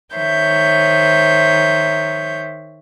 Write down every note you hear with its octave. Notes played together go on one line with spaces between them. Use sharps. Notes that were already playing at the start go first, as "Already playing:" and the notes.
D#3 C5 C#5 E5 G6